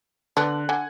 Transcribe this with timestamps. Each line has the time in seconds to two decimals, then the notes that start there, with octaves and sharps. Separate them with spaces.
0.37 D3 B3 D4 F#6
0.69 D3 F#5 G#5